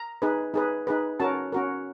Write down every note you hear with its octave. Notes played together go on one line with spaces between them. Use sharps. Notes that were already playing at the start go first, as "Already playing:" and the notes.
Already playing: A#5
D#4 G#4 B4
D#4 G#4 B4
D#4 G#4 B4
C#4 F#4 A#4 A5
C#4 F#4 A#4